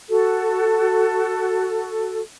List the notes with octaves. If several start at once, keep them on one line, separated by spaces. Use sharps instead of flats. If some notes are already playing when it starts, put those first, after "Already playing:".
F#4 A4